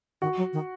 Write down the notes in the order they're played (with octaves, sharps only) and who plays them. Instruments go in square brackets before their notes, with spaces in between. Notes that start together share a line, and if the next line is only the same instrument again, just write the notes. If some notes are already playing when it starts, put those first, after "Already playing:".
[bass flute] D#3 [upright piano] F#4
[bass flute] F#3
D#3